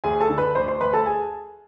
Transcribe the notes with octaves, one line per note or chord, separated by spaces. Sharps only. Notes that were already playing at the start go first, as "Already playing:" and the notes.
D2 G#4 G#5
A4 A5
D3
B4 B5
D2 C5 C6
C5 C6
D2 B4 B5
A4 A5
G#4 G#5